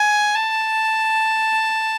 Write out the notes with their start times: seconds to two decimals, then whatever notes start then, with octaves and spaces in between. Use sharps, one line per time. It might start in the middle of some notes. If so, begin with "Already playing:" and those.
Already playing: G#5
0.35 A5